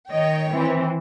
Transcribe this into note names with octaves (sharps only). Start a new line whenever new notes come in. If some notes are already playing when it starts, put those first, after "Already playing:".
D#3 C#5 D#5 G5
E3 C4